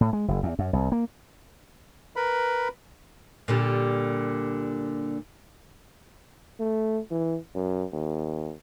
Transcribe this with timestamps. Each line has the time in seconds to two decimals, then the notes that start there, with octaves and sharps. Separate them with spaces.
0.01 A2
0.13 G#3
0.28 F#1
0.43 E2
0.59 F#2
0.73 C2
0.92 A#3
2.16 A#4 B4 B5
3.48 A#2 D3 G3
6.60 A3
7.11 E3
7.55 F#2
7.93 D#2